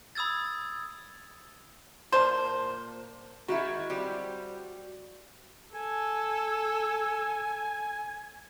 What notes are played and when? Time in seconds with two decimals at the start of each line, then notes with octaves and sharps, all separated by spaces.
0.15 B5 D#6 E6 G#6 A6
2.12 A#2 A#3 C5 A5
3.48 D#3 G#3 E4 F#4
3.90 G3 C4 G4
5.75 A4 G#5